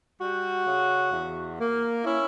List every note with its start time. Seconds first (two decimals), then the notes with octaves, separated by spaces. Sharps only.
0.19 G3 F#4
0.66 C#3
1.12 E2
1.58 A#3
2.04 C#4 E4